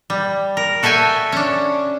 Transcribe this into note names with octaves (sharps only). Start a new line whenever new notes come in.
G3
A#4
F#4 A4 E5 G5 G#5
C#4 D4